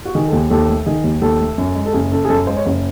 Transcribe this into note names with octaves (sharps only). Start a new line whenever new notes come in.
F#4
D#3 G#4
A4
D#2 G#4
D#2 A4
A3
D#3 G#4
D#2
D#2 A4
A3
F#2
G#3
A4
F#1 G#4
C#3 A4
G#4
F#2 A4
G#3 C5
C#5
F#1 C5